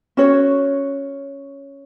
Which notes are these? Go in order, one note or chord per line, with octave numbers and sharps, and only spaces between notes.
C#4 F#4 C#5